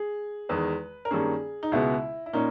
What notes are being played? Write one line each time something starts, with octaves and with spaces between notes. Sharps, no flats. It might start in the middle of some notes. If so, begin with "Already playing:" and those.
Already playing: G#4
E2 D#3 G#3 B4
A#4
G2 D#3 A#3 C#4 G#4
D#4
C#2 B2 G#3 B3 E4
E4
A#2 A#3 C#4 D#4